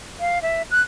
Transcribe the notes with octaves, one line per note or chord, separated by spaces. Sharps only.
F5
E5
F#6